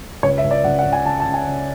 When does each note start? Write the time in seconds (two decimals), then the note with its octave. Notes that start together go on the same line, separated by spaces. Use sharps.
0.23 C#2 C#5
0.38 E5
0.44 C#2
0.51 D5
0.64 C#2 F#5
0.79 F#5
0.85 C#2
0.93 G#5
1.06 C#3 A5
1.20 A5
1.26 C#3
1.34 G#5
1.47 C#3